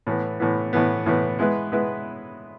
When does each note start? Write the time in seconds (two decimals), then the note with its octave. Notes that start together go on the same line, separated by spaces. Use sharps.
0.07 A2 E3 B3
0.40 A2 E3 B3
0.73 A2 E3 B3
1.06 A2 E3 B3
1.39 G#3 B3 E4 B4
1.72 G#3 B3 E4 B4